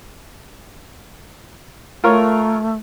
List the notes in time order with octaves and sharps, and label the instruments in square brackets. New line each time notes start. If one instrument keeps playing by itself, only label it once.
[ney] A3 [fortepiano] F4 A#4 C#5